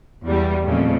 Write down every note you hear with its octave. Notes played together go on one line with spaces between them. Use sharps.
E2 G3
F2 A#2 C#3 A3